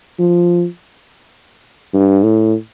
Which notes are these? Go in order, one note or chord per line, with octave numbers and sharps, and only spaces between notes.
F3
G2
A2